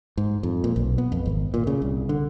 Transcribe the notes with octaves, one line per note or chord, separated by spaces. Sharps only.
G#2
F2
A#2
B1
B3
F2
G#1
A#2
C#3
C2
D3